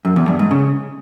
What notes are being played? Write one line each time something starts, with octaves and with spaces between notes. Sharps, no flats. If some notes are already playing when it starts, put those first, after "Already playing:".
F#2
E2
G2
G#2
C#3